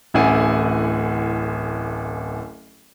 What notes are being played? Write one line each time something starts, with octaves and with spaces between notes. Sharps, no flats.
D1 A1 E4 F#5 G#5